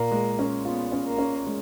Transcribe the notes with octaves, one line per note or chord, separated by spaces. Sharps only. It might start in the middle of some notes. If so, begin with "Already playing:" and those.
Already playing: A#2 A#3
G#3
C#4
B3 F4
C#4
A#3
C#4
G#3